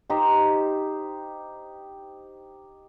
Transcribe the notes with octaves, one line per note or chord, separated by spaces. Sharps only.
D#4 G4 C5